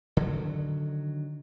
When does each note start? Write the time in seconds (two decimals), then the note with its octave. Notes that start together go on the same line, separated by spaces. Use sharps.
0.17 D3 D#3 F#3